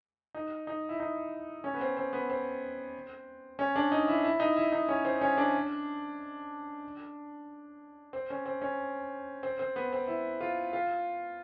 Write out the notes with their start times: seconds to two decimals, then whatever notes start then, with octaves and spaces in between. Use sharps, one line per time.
0.35 D#4
0.67 D#4
0.89 E4
1.00 D#4
1.64 C#4
1.74 B3
1.81 C4
1.97 C4
2.13 B3
2.30 C4
3.59 C#4
3.76 D4
3.92 D#4
4.08 E4
4.24 E4
4.40 D#4
4.57 E4
4.72 D#4
4.89 C#4
5.05 C4
5.21 C#4
5.37 D4
8.13 C4
8.30 C#4
8.46 C4
8.62 C#4
9.43 C4
9.59 C4
9.76 B3
9.92 C4
10.08 E4
10.41 F4
10.73 F4